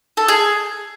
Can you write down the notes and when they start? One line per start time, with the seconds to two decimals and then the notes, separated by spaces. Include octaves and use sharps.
0.17 A4
0.28 G#4